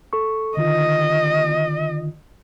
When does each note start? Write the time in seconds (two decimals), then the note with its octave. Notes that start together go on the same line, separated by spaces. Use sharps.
0.13 A4 C#6
0.57 D3 D#3 F4 D#5